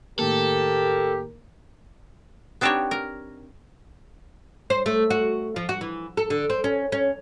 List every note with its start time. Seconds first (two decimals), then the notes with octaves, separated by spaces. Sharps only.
0.19 A2 D#3 A#3 G4 A4 A#4
2.61 B3 C4 D4 D#4 G4 C#5
2.91 A#4
4.70 C5
4.86 A3
5.10 F#4
5.56 F3
5.69 F#4
5.81 E3
6.17 A4
6.30 D3
6.50 C4
6.64 C#4
6.92 C#4